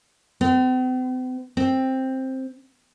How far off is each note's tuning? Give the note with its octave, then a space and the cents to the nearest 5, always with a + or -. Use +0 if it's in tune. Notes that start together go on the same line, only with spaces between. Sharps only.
C4 -45
C4 +10